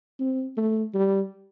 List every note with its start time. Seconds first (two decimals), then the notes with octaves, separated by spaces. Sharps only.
0.20 C4
0.57 A3
0.95 G3